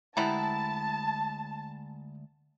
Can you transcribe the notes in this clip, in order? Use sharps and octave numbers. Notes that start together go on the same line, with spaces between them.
D2 G3 G#3 B3 E4 A5 A#5